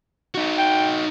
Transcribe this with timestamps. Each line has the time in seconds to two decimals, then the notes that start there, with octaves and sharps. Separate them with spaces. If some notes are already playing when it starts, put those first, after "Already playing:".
0.35 D#4 F#4
0.59 G5